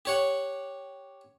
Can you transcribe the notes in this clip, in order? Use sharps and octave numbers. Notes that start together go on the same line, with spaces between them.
G4 C#5 F#5